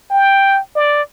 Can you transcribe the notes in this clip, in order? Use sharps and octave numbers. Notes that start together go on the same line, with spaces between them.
G5
D5